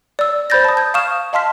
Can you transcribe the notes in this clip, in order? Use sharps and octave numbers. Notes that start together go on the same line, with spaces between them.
D5 E6
C5 D5 B5 G6 A6 A#6
A5 D#6
G6 G#6
F5 C#6 D#6 F6 E7
D#5 F5 A5 C6 F6 B6